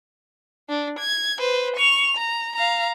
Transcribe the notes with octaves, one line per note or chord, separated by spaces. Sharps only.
D4
G#6
B4 C5
C#6 F7
A#5
F5 A#5